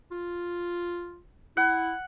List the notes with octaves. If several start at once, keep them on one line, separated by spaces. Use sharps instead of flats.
F4
E4 F#5